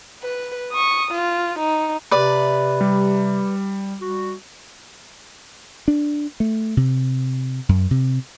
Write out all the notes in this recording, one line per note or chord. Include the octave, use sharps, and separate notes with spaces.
B4
C#6 D#6
F4
D#4
C3 B4 D5
G3
G3 F#4
D4
A3
C3
F#2
C3